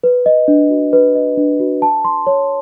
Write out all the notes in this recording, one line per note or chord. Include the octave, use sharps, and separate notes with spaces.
B4
D#5
D4
F#4
B4
D#5
D4
F#4
A5
C6
C#5